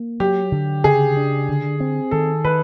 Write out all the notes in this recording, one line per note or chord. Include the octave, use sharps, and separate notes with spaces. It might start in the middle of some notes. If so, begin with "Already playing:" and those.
Already playing: A#3
F#3 G4
D3
C#3 G#4
D4
D3
C4
D#3 A4
D#3 B4